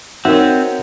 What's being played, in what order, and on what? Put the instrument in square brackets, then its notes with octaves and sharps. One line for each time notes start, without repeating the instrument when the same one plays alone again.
[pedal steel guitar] C4 [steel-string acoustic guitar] D#4 A#4 C#5 [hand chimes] F#4 E5 [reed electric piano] F#5